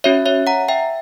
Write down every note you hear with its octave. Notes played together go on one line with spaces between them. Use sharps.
C#4 F#4 C#5 E5
C#5 E5
F#5 A#5
E5 G5